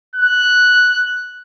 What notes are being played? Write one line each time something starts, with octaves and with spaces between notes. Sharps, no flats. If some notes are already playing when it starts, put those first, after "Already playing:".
F#6